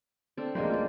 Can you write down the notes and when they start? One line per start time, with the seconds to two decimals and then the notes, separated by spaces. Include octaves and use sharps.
0.37 C4 D4 A4
0.55 A1 F#3 G#3 A#3 C5
0.70 F4 D5